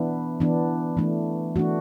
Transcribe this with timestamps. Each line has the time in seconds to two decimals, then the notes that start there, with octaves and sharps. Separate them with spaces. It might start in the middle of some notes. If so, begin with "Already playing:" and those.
Already playing: E3 B3 D4 E4
0.40 E3 B3 D4
0.97 E3 A3 D4
1.56 E3 A3 D4 F#4